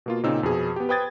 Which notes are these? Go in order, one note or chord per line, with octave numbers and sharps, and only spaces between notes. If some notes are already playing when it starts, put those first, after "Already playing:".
B2 A#3 F4
A#2 C#3 C4 D#4 E6
F2 B2 G#4
B3 G4
B4 C5 G5 D#6 G#6 A6